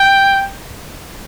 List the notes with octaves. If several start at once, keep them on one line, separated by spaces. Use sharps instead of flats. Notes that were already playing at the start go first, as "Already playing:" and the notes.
Already playing: G5